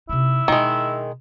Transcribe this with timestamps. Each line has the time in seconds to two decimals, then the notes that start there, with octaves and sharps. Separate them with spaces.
0.09 C3 D#4 E4
0.48 B2 D#3 G#3